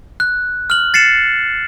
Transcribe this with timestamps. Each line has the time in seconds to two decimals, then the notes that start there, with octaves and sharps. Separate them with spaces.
0.20 F#6
0.70 F6 F#7
0.94 A6 C7 C#7 E7